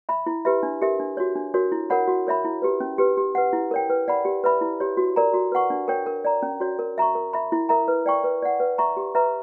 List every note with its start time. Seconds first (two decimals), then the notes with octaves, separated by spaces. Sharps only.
0.09 E5 B5
0.26 E4
0.45 G4 B4 E5 B5
0.63 D4
0.82 G4 A#4 E5
1.00 D4
1.17 F#4 C#5
1.36 D4
1.54 F#4 A#4 C#5
1.72 E4
1.90 A#4 C#5 F#5 B5
2.08 F#4
2.27 A#4 C#5 E5 B5
2.45 E4
2.62 G4 B4
2.80 C#4
2.98 G4 B4
3.17 G4
3.35 B4 F#5
3.53 E4
3.71 A#4 C#5 G5
3.90 B4
4.08 D5 F#5 B5
4.25 G4
4.44 B4 E5 B5
4.61 E4
4.80 G4 C#5
4.97 F#4
5.16 A#4 D5 A#5
5.34 F#4
5.52 B4 F#5 C#6
5.70 D4
5.88 A#4 C#5 G5
6.06 A#4
6.25 D5 A#5
6.42 C#4
6.60 F#4 C#5
6.79 A#4
6.98 E5 A#5 C#6
7.15 A#4
7.33 E5 B5
7.52 E4
7.69 A#4 E5 A#5
7.88 B4
8.06 D5 G5 C#6
8.24 B4
8.42 D5 F#5
8.60 B4
8.78 E5 A#5 C#6
8.97 G4
9.15 B4 E5 A#5